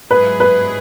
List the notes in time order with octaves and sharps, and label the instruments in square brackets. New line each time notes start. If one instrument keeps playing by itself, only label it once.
[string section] G#2 F#3 E4 G#4 [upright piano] B4
[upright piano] B4